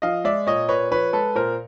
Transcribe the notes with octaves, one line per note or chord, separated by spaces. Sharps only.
F3 D#5 F5
G#3 D5 E5
A#2 C#5 D#5
A#2 B4 C#5
F3 B4 C#5
G#3 A4 B4
A#2 A#4 C5